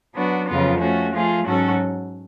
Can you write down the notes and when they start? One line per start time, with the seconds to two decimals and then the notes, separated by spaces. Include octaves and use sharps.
0.14 F#3 B3 D4 F#4
0.47 F2 C#3 F#3 B3 F4
0.80 F3 A3 C#4 F#4
1.12 F3 A3 F4 G#4
1.44 G#2 F#3 C#4 F#4 A4